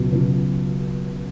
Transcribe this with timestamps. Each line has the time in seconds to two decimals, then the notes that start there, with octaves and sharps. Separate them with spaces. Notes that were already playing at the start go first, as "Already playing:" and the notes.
Already playing: C#2 B2 F#3
0.11 C#2 B2 F#3